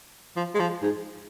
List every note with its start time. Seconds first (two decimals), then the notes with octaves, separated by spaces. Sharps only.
0.36 F3
0.55 G#3
0.60 F3
0.83 G#2